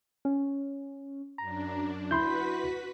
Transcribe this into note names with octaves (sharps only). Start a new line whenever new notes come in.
C#4
F#2 D4 A#5
E4 F#4 B4 B5 C6 G6 B6